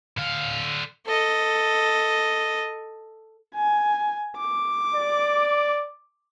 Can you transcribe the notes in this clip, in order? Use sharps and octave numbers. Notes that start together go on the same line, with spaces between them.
D3 F5
A4 D#5
G#5
D6
D5